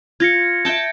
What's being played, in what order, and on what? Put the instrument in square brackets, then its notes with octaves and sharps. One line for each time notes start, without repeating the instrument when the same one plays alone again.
[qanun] F4 [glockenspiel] G#6 A#6 C#7
[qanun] E5 G5 A5